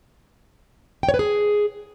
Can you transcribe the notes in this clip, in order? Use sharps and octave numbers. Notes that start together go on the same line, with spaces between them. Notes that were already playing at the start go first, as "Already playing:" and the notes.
G5
C#5
B4
G#4